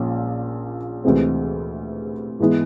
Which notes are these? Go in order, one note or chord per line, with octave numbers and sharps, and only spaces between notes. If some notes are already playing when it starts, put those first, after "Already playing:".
Already playing: A#1 A#2 F3 A#3 C#4
D2 C3 E3 G#3 C4
G#2 E3 G#3 B3 E4